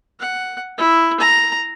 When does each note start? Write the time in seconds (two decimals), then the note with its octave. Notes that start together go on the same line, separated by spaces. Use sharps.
0.20 F#5
0.78 E4
1.20 A#5